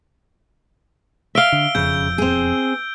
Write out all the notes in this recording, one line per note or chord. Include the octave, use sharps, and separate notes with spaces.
E5 F5 E6 D7 G7
D3
E1 F2 C#3 G6
C4 G#4